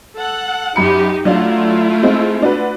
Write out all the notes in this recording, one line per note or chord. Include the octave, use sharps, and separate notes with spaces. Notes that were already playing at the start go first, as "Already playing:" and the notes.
A4 F#5
F#2 D#4 G4 B5 C#7
F#3 A3 D4 E4 F4 F5
G#3 C4 D#4
D4 F#4 B4